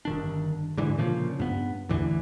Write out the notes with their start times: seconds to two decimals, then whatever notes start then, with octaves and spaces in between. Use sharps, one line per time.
0.05 G1 D#3 D4
0.77 G#2 D3 E3
0.98 A#2 C#3 F3
1.40 G2 B3
1.89 A1 E2 D3 E3